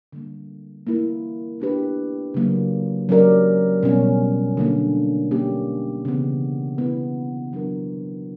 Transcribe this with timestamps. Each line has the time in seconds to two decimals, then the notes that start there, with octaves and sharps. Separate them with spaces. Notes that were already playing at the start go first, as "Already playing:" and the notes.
0.13 D3 G3 A#3
0.87 A#3 E4 A#4
1.60 B3 D4 G4 B4
2.34 C#3 F#3 A#3
3.09 F#3 C#4 G4 A#4 D5
3.83 B2 G3 C#4
4.57 D3 A#3 D4
5.31 A#3 C#4 G4
6.05 C#3 E3 B3
6.78 B3 E4 B4
7.53 F#3 B3 D4 F#4 A#4